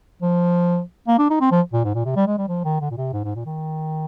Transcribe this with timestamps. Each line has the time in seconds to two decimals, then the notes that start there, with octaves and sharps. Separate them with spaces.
0.22 F3
1.08 A#3
1.18 D4
1.30 D#4
1.41 C4
1.51 F3
1.73 A#2
1.84 G#2
1.94 A#2
2.06 C3
2.16 G3
2.27 G#3
2.38 G3
2.48 F3
2.64 D#3
2.81 D3
2.91 A#2
2.97 C3
3.13 G#2
3.24 G#2
3.35 A#2
3.46 D#3